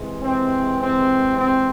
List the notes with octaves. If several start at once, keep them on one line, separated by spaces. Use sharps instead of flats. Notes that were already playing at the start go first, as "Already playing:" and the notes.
Already playing: C3 E3 G#3
C4
C4
C4